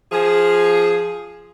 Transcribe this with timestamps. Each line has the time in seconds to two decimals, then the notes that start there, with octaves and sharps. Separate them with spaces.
0.12 F3 G#4